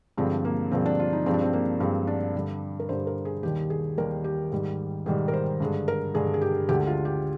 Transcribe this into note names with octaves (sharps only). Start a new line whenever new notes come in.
G2 D3 F3 G#3 C4
A#3
G2 D3 F3 G#3 C4
D4
F4
D#4
G2 F3 G#3 C4
D4
C4
A#3
G2 F3 G#3 C4
D4
G2 D3 G3
A#4
G2 D3 G3 C5
A#4
G#4
D#2 D#3 G3 G4
G#4
D#2 D#3 G3 A#4
G4
G#2 D#3 G3
G#2 D#3 G3 G#4
A#4
C5
G2 D3 G#3
A#4
G2 D3 G#3 G#4
G#4
G4
D2 D3 G#3 G4
F4
G4